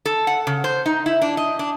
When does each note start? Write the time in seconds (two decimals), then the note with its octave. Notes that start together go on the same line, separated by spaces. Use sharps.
0.06 A4
0.27 F#5
0.47 C#3
0.64 C5
0.86 D#4
1.06 E4
1.22 D4
1.37 D#5
1.59 D4